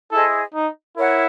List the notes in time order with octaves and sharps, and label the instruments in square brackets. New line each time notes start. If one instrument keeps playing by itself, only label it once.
[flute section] E4 G#4 C5 D#5 [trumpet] A4
[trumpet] D#4
[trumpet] E4 [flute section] A#4 C#5 F#5